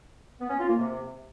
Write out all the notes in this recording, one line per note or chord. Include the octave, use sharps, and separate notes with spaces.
B3
C#4
F4
A#3
C3